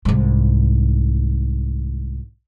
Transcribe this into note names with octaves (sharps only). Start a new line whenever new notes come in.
C2 G#2